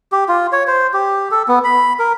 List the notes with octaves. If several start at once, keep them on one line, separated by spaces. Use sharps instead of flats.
G4
F4
C#5
C5
G4
A4
B3
B5
A#4